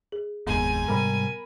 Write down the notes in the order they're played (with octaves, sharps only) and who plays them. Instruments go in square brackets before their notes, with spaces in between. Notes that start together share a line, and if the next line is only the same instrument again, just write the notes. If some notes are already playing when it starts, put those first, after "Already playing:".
[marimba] G#4
[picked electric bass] F1 A#1 D#2 [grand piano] G#2 [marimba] B3 [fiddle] G#5
[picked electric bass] G#2 C3 G3 [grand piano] A#4 B5